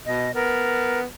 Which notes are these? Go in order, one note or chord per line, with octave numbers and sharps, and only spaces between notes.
B2 D#5
B3 A#4